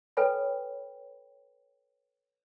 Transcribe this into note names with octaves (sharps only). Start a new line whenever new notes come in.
A4 B4 C#5 G5 G#5 B5